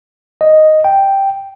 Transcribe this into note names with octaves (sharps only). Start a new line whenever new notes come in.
D#5
G5